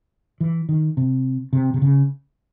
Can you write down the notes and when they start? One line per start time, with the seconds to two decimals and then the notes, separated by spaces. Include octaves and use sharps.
0.41 E3
0.69 D#3
0.97 C3
1.53 C3
1.74 C3
1.82 C#3